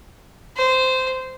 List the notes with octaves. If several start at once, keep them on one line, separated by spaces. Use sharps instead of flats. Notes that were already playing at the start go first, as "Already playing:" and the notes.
C5